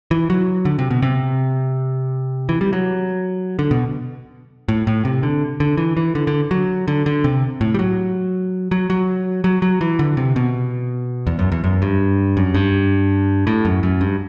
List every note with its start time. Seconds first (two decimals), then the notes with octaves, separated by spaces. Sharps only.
0.11 E3
0.30 F#3
0.65 D3
0.79 C3
0.90 B2
1.02 C3
2.49 E3
2.61 G3
2.73 F#3
3.59 D3
3.71 B2
4.68 A2
4.87 A2
5.05 C3
5.23 D3
5.60 D3
5.77 E3
5.97 E3
6.15 D3
6.27 D3
6.51 F#3
6.88 D3
7.06 D3
7.24 C3
7.61 A2
7.74 G3
7.79 F#3
8.71 F#3
8.90 F#3
9.44 F#3
9.62 F#3
9.81 E3
9.99 D3
10.17 C3
10.36 B2
11.27 E2
11.39 F#2
11.52 E2
11.64 F#2
11.82 G2
12.37 F#2
12.54 G2
13.47 A2
13.65 F#2
13.83 F#2
14.01 G2